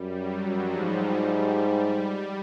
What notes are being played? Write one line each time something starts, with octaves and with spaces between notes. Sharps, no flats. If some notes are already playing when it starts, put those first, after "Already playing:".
Already playing: F#2 G3
F#3
F#2 F3
G#2
G3